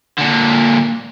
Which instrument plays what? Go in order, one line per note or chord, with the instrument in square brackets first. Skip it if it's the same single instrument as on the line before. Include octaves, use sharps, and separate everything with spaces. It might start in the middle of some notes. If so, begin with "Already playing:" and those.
[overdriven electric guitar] A#2 D3